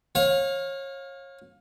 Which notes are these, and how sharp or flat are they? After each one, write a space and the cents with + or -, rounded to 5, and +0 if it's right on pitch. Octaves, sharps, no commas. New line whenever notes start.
C#5 -30 F5 +20